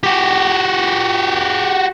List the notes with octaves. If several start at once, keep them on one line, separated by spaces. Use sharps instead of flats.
F#4 G4